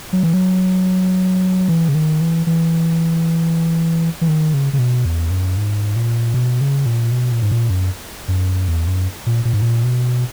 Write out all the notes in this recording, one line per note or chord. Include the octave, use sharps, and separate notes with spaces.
F#3
E3
F#3
E3
C#3
D#3
E3
E3
E3
D#3
C#3
C#3
B2
E2
F#2
G#2
A#2
B2
C#3
A#2
B2
A#2
G#2
A#2
F#2
F#2
E2
F#2
A#2
A#2
G#2
A#2
B2